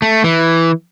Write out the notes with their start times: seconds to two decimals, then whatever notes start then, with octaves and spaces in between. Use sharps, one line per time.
0.02 A3
0.24 E3